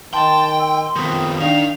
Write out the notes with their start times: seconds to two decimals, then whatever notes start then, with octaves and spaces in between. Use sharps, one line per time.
0.13 D#3 G5 A5 C6
0.59 E6
0.96 F2 D#3 B3 D#6
1.40 D#3 D4 D#4 F5 F7